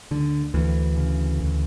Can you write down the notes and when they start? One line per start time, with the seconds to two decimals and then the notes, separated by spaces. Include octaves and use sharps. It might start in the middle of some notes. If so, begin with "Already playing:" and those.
0.11 D2 D3
0.54 D2 E3
0.97 C#3
1.40 D2